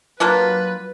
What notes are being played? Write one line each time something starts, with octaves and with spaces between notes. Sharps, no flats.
F#3 A#3 D4 F4 B4